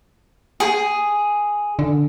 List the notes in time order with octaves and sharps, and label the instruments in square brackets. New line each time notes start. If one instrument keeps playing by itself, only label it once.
[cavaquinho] G#4
[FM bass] D3